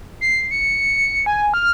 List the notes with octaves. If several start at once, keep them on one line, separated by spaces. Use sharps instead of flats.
C7
C#7
G#5
F6